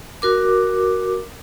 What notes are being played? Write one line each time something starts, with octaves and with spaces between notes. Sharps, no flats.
F#4 A#4 D6